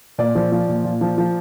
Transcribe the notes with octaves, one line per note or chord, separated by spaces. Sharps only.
A#2 D5
F3
F3
A#2
A#2
F3
F3